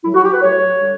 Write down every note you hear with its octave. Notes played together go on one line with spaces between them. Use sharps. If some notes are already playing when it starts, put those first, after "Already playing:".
A2 F#3 E4
F#4
G4
B4
A2 F#3 C#5
D3 G3